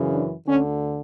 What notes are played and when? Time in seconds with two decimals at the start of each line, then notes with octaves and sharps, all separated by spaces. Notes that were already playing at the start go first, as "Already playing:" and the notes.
Already playing: F#2 C#3 E3
0.11 D4
0.47 D2 D3 C#4